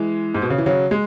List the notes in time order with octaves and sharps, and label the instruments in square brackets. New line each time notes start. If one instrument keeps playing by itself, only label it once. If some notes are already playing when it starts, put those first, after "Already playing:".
Already playing: [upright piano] E3 G#3
G#2
B2
C#3
E3
C#3 F#3
G#3